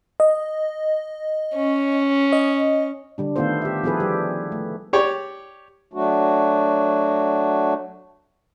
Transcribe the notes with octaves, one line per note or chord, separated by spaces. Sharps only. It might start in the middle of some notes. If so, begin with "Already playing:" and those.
D#5
C#4
D#5
D3 G3 D4
D#3 A3 B3 F4 A4 C5
G4 E5
F3 B3 E4 G#4 A4 B4
G3 G4
A3
G4 C#5 D5
F#3 A3 D4 F#4